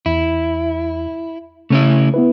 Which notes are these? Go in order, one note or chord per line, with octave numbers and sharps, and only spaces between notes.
E2 E4
C#3 A3 C#4 E4
B3 E4 B4